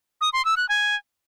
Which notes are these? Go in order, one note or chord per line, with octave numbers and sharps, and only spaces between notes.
D#6
C6
E6
F#6
G#5